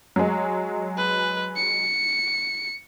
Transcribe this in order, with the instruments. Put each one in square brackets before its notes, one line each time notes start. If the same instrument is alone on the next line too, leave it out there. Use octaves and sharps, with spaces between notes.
[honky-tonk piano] F#3 G#3
[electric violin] B4
C#7